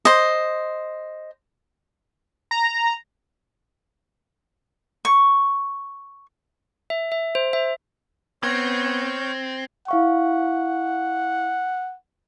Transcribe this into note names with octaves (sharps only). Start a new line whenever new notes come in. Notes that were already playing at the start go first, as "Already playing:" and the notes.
C5 D#5
A#5
C#6
E5
E5
C5
E5
B3 C4 C#5 F6 G6 G#6 A#6
E4 F5 F#5 C#6